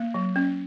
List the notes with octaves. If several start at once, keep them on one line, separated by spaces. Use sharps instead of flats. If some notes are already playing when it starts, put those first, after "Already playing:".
Already playing: A#3
F#3
C#4